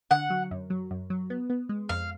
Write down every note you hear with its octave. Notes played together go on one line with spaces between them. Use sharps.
D3 F#5
F#3
F#2
F#3
F#2
F#3
B3
B3
G#3
F2 F5